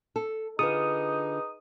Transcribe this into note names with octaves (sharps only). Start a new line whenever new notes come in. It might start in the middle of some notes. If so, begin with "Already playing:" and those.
A4
D3 D#4 F4 G#4 B4 D#6